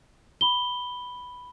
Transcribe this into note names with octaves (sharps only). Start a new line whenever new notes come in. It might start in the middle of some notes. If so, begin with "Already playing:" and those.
B5 G7